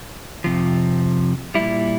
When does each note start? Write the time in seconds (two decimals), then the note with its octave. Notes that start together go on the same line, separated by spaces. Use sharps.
0.44 F2 C3 F3
1.54 A#2 G3 E4